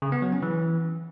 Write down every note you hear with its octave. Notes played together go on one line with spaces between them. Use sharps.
C#3
B3
F#3
C#4
E3